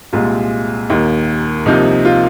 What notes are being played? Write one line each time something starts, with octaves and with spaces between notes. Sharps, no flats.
C2 A#2 G#3 F4
D#2 D#3 A#3
C2 C3 F3 A#3 D#4
F4